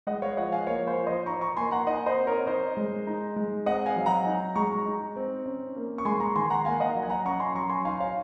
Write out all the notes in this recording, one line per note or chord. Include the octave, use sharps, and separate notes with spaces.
G#3 D#5 F#5
C#5 F5
F3 D#5 F#5
F5 G#5
A#3 C#5 F5
C5
F3
C5 D#5
D#4 A#5 C#6
A#5 C#6
A#3 G#5 C6
F#5 A#5
D#4 D#5 F#5
C5 D#5
C4
A#4 C#5
D#4 C5 D#5
G#3
D#4
G#3
C4 D#5 F#5
F5 G#5
F#3
F#5 A#5
D#4
G#3 A#5 C#6
D#4
C4
C#4
A#3
C#6
G#3 G#5 C6
A#5 C#6
D#3 G#5 C6
F#5 A#5
A#3 F5 G#5
D#5 F#5
F#3
G#5
F#5 A#5
C#4 A#5 C#6
G#5 C6
F#3 A#5 C#6
G#5 C6
D#4 F5 G#5
C#5 F5